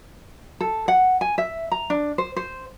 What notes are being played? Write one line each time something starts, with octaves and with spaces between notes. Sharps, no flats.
A4
F#5
G#5
E5
A#5
D4
C5
C5